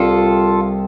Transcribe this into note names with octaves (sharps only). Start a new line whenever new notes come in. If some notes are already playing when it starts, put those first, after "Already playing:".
Already playing: C2 G3 F4 A4